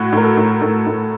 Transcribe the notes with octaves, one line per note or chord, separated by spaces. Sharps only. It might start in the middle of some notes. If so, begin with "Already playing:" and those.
Already playing: A2 F#4
A2 A#4
A4
A2
A2 A4
A2